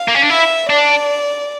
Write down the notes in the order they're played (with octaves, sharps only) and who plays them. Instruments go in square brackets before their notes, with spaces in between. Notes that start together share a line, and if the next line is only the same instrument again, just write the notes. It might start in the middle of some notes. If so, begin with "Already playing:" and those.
Already playing: [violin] F5
[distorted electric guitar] A#3
C#4
D4
[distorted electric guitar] E4 [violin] E5
[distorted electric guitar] D4 [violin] D5